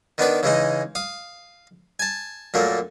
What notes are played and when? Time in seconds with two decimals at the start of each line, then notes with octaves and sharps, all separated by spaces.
0.18 D#3 B3 D4 B4
0.43 C#3 E3 G#3 D#4
0.95 F5 D#6
1.99 G#5 A5
2.54 F#2 A#2 A3 A#3